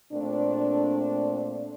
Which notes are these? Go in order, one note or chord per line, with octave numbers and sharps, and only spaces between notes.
A#2 A3 C4 D4